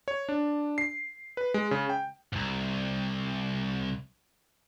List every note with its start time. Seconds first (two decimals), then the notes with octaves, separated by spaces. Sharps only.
0.08 C#5
0.29 D4
0.78 C7
1.37 B4
1.54 G#3
1.71 C#3
1.90 G5
2.32 C2 G#2